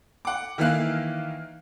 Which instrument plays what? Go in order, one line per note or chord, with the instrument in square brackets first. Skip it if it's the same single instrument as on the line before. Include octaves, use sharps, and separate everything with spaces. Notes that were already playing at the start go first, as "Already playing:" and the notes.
[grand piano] F#5 D6
D#3 E3 A#3 E5 F5 F#6